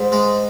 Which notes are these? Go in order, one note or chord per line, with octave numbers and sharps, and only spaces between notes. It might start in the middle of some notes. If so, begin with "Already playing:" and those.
Already playing: G#2
G#3